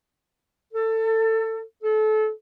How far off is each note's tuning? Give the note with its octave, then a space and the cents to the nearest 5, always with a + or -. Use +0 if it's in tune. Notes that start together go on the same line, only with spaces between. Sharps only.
A4 +20
A4 -30